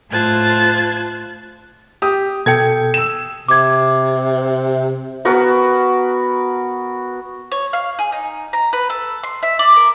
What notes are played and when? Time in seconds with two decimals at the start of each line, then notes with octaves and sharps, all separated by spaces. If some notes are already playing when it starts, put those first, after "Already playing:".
0.12 A2 F4 C5 A5 F#6 G#6
2.02 G4 D#6
2.46 B2 A4 G5 G#6 C#7
2.94 E6 E7
3.48 C3 D6 G#6
5.25 B3 F#4 A#4 B4
7.52 C#5
7.73 F5
7.99 G#4
8.12 D#4
8.53 A#5
8.73 B4
8.90 A4
9.23 C6
9.43 E5
9.59 D5
9.76 A#4